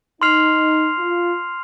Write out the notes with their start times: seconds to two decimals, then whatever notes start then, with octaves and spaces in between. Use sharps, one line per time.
0.21 D#4 C6 F6 C7 F7
0.99 F4